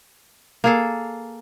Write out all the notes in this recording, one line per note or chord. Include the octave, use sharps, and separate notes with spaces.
A#3 G#4 A4